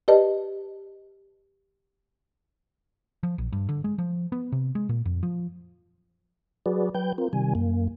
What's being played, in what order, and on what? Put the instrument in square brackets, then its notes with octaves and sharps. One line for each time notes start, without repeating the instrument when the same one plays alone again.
[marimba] G4 B4 D5 D#5 A5
[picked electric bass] F3
A#1
G2
D3
G#3
F3
B3
C3
G#3
A#2
F2
F3
[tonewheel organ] F#3 F#4 G#4 B4 D5
F#3 B4 G5 G6
C4 F4 A#4
C3 D#3 G3 G#5
F#2 A#3